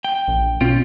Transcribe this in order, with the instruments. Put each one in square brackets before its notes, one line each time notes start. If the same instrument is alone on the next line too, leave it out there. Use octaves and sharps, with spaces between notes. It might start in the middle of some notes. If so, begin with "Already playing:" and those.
[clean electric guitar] G5
[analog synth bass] A#1
[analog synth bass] B2 [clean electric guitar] C4 C#4 F4